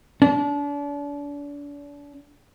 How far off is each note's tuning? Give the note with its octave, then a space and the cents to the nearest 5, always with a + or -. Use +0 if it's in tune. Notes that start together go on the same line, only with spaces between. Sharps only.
D4 -35